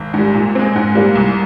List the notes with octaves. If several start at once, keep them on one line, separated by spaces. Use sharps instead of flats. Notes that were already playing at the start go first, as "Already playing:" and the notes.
Already playing: G#1
G#2
G3
A#2
G#3 C4
G#2
G3 A#3
C2